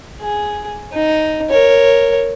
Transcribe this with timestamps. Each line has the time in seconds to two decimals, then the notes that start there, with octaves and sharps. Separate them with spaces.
0.21 G#4
0.93 D#4
1.50 A#4 C#5